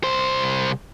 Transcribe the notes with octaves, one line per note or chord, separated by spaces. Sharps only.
C2 C5